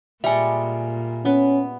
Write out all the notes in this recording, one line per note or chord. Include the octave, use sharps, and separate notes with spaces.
A#2 G3 G#3 E5 G#5
B3 C#4